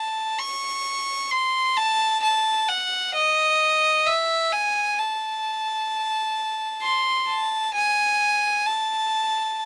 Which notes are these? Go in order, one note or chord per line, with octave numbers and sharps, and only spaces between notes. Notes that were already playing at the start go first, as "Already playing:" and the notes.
Already playing: A5
C#6
C6
A5
A5
F#5
D#5
E5
G#5
A5
C6
A5
G#5
A5